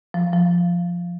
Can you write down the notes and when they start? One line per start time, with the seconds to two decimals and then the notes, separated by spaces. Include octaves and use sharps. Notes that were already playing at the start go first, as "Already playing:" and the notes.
0.14 F3
0.33 F3